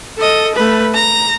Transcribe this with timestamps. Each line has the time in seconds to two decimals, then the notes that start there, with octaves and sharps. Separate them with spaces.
0.17 A4 D#5
0.54 A3 B4
0.94 A#5